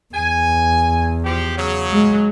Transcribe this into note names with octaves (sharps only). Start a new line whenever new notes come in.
E2 G#5
F3 G4
C#3 F#3
G#3